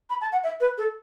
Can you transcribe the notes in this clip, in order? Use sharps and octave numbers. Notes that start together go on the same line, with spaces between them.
B5
A5
F#5
E5
B4
A4